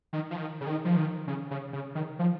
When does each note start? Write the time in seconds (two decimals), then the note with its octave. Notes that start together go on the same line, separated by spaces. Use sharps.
0.13 D#3
0.31 F3
0.36 D#3
0.61 C#3
0.67 D#3
0.85 F3
0.96 D#3
1.27 C#3
1.51 C#3
1.73 C#3
1.95 D#3
2.19 F3